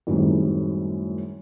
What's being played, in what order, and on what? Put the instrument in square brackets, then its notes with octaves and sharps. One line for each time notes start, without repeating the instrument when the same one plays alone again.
[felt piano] F#2 A2 D#3 G3 G#3 C4